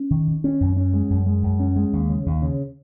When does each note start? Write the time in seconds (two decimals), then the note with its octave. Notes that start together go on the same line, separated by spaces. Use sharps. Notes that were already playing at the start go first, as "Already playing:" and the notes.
Already playing: C#4
0.11 D#3
0.28 D#3
0.44 C#4
0.61 F#2
0.77 C#4
0.93 G#3
1.10 F#2
1.26 G#3
1.43 F#2
1.60 C#4
1.76 G#3
1.93 D#2
2.09 C#3
2.26 D#2
2.42 C#3